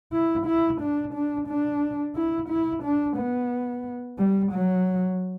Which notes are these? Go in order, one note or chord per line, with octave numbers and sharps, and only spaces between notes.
E4
E4
D4
D4
D4
E4
E4
D4
B3
G3
F#3